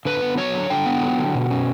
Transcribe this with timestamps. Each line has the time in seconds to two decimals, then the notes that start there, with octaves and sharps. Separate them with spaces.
0.05 D3 B4
0.22 B3
0.37 F#3 C#5
0.54 D3
0.70 D3 G5
0.86 B3
1.02 F#3
1.18 D3
1.35 B2
1.50 C#4